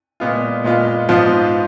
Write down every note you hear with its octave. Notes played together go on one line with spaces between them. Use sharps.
A#2 G#3 B3 F4
A#2 G#3 B3 F4
G#2 F3 B3 F4